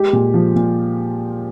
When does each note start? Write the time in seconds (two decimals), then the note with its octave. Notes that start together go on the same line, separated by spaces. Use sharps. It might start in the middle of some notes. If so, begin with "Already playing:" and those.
Already playing: G#3 G4
0.13 A#2
0.34 F3
0.56 A#2